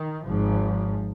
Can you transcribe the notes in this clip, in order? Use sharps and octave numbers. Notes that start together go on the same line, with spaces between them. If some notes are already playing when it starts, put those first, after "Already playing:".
Already playing: D#3
G#1 G#2 F3